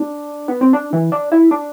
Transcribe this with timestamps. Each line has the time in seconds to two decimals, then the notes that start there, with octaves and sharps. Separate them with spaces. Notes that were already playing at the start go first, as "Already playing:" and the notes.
Already playing: D4
0.48 B3
0.61 C4
0.73 D4
0.93 E3
1.12 D4
1.32 E4
1.51 D4